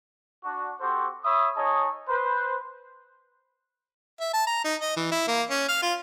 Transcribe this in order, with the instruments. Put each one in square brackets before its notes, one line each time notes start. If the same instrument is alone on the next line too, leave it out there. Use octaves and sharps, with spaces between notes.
[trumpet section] D4 F#4
C4 F#4 G4 A4 C5
C#5 E5 B5 D#6
D#4 G#4 C#5 D#5 A5 D#6
B4 C5
[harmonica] E5
A5
A#5
D#4
D#5
E3
E4
A#3
C#4
F5
F4